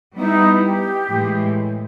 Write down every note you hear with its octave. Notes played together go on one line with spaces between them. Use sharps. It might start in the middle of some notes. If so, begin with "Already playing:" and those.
G3 B3 D#4 E4
G4
A2 E3 G#3